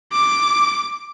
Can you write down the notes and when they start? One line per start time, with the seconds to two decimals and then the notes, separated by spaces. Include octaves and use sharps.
0.13 D6